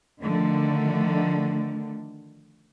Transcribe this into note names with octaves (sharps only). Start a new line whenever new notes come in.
D3 D#3 F3 A3